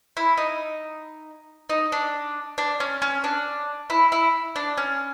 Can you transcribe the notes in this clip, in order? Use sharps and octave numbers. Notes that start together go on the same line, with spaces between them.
E4
D#4
D#4
D4
D4
C#4
C#4
D4
E4
E4
D4
C#4